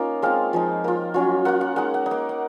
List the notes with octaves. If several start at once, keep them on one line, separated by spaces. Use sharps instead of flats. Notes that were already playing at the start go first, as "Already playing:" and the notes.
Already playing: A#3 C#4 D#4 F4
G#3 C4 F4 F5
F3 G#3 D#4
A#3 F4
F#3 C#4 F4
A#3 F4 F#5
F#5
G#3 D#4 F#5
F#5
D#4
A#3
F#5